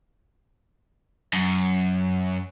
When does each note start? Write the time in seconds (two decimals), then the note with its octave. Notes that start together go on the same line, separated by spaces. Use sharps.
1.33 F#2